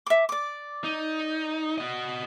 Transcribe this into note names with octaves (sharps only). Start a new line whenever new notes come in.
E5 D6
D5 D6
D#4
F#4 D#5